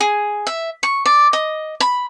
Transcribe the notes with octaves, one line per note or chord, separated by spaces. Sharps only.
G#4
E5
C#6
D5
D#5
B5